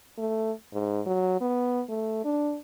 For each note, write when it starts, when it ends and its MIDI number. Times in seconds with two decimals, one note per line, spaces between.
0.18 0.52 57
0.74 1.01 44
1.06 1.37 54
1.41 1.82 59
1.89 2.21 57
2.25 2.58 62